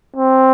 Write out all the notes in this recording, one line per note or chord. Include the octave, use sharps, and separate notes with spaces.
C4